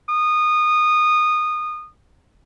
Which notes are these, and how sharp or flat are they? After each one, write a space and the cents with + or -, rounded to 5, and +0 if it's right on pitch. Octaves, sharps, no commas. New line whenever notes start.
D#6 -20